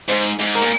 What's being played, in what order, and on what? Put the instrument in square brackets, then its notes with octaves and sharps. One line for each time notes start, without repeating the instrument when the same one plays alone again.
[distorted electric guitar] G#2 [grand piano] C5
[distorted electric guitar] G#2
[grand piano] A#4
[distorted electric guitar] A#2